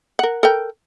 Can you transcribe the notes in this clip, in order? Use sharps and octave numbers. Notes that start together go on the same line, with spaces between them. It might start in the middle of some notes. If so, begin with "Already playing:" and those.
A#4 F#5
A4 A#4 G5